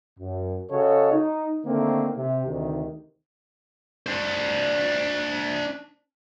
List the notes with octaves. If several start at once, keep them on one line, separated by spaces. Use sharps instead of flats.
F#2
C#3 F#4 A4 C#5 D#5
D#4
D3 D#3 A3 A#3 C4
C3
D2 C3 D#3
D4 C5